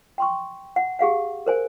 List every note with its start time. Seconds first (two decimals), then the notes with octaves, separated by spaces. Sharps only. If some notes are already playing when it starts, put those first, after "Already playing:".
0.18 G5 C6 C#6
0.76 F#5
0.99 G4 G#4 F5 F#5
1.46 A#4 C5 G#5